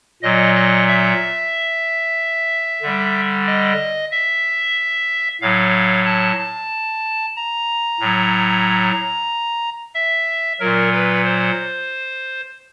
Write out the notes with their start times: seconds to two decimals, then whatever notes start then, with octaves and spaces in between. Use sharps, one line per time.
0.22 A#2 F#3 D#5
0.55 D#5
0.88 E5
2.82 D3 G3
3.47 D#5
4.11 E5
5.41 A2 F#3 F5
6.06 A5
6.39 A5
7.36 A#5
8.00 A2 F#3
9.94 E5
10.60 A#2 F#3 A#4
10.92 B4
11.24 C5